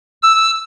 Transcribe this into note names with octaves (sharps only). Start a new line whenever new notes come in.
E6